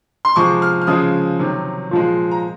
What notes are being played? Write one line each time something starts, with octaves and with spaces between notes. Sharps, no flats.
C6
C3 F3 G#3 C#6
F6
F6
C#3 F3 G#3 D#6
C3 D#3 F#3
A#2 F3 G#3
A#5